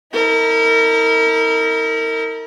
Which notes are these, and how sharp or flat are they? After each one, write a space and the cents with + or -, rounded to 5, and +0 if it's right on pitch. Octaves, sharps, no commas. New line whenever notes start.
D#4 +45 A#4 -30